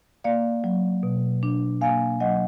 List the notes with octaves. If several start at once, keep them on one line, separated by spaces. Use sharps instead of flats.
A#3 D5 F5
F#3
B2
D4
A#3 F5 G#5
F#3 D#5 F#5